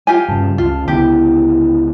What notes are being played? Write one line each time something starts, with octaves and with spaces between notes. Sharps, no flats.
F4 G4 G#5
G2 C#3 A5
C#2 C#3 F4
C#2 D3 B3 E4 G4